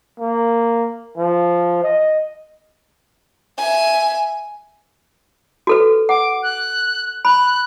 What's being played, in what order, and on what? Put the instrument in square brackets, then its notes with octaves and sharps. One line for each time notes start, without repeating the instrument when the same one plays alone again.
[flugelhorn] A#3
F3
D#5
[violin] E5 G#5
[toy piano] F#4 A4 B4
[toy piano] F#5 [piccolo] D6
[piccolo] F#6
[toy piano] B5 [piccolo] F#6